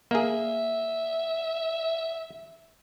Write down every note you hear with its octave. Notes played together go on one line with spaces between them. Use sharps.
A#3 G#4 E5